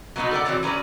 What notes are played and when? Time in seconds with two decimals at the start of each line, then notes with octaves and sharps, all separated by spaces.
0.16 F#3 G#3 B3 C#4 D#4 F#4
0.31 A4 A#4 D5 F#5
0.44 E3 C4 F#4 A4 C#5 D5
0.63 F#3 C#4 A4 B4 D5